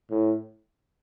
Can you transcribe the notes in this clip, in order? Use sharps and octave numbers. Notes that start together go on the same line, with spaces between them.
A2